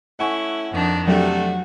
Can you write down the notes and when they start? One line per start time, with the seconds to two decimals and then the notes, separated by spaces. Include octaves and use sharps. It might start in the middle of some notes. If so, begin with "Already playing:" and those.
0.19 A3 C#4 E4 F#5 G#5 C#6
0.72 F2 D#3 D4
1.07 C3 F#3 A3 D4 F#4 G4 A4